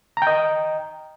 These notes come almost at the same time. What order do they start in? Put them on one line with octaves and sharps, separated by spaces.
A#5 G5 D#5